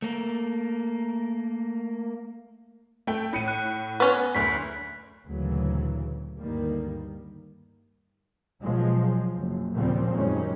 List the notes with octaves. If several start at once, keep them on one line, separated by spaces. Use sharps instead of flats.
A3 A#3
A3 G5
A2 C#7 D#7
F#6
B3 C#4
F#1 D2 B6
D2 A#2 C#3 E3 F#3
D2 G2 D#3 G3 A#3
B2 F3 F#3 G#3
F#1
D#2 A#2 C#3 F3 G3 C4
F#2 D#3 G3 G#3 C#4